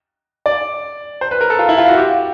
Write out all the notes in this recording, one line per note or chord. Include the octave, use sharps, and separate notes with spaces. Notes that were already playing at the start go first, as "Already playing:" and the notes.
D5
C5
B4
A#4
A4
F4
E4
F4
F#4
G4